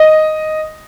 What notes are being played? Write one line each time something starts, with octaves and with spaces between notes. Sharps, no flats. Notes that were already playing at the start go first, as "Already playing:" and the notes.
Already playing: D#5